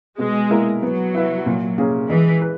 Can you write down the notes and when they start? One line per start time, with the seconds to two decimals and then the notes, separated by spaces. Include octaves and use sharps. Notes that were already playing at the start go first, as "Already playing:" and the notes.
0.18 B2 G#3
0.51 A#3 E4 A#4
0.83 F#3 B3
1.14 E4 B4 E5
1.46 A#2
1.78 A#3 C#4 G#4
2.09 E3 G#3
2.42 B4